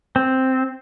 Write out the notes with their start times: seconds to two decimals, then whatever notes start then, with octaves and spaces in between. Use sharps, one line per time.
0.16 C4